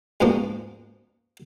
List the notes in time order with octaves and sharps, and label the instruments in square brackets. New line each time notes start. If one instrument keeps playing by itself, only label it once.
[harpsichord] C#2 G#2 B2 F3 A#3